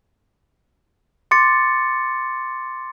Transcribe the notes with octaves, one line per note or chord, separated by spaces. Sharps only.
C6 D6 A6 C#7